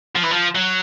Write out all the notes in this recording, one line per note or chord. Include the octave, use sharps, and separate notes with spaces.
F3
E3
F3
F#3